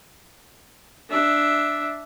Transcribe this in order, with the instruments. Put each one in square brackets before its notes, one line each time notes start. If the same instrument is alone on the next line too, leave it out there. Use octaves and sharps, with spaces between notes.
[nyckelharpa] D4 E5